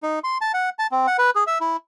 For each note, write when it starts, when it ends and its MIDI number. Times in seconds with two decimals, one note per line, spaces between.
0.03 0.19 63
0.24 0.38 84
0.41 0.52 81
0.54 0.70 78
0.79 0.87 81
0.92 1.07 60
1.07 1.17 78
1.18 1.30 71
1.36 1.44 68
1.47 1.58 76
1.61 1.77 64